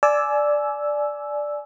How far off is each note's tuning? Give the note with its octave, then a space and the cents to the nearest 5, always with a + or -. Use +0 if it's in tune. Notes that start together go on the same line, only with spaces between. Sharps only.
D5 +0 G#5 +25 E6 +0